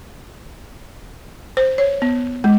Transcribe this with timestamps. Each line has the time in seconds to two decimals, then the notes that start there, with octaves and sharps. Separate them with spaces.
1.57 C5
1.78 C#5
2.02 B3
2.44 G#3